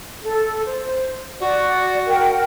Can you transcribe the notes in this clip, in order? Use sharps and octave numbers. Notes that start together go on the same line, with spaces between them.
A4
C5
F#4 D5
A#4 F#5 G5